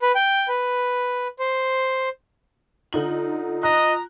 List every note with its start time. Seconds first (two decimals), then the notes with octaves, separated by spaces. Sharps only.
0.02 B4
0.15 G5
0.48 B4
1.39 C5
2.93 D3 D#4 F4 F#7
3.63 D#5 A#5 D#6 F#6